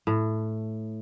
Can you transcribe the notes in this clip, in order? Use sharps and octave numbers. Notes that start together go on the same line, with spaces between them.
A2